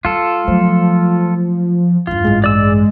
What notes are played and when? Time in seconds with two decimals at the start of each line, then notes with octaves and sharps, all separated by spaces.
0.05 G3 F4 A4
0.47 F3 F#3 A3
2.07 E2 G2 F4
2.24 A1 G2 G#3
2.44 D5 E6